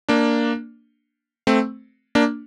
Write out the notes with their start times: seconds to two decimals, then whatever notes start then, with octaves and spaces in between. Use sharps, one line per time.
0.09 A#3 D4
1.47 A3 C4
2.15 A#3 D4